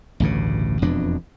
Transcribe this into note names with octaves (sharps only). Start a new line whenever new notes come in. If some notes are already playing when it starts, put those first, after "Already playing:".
A1 D2 G2 C#3
E1 F2 B2 D4